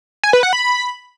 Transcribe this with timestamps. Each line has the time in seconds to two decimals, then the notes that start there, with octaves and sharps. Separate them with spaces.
0.23 G#5
0.33 B4
0.43 F#5
0.53 B5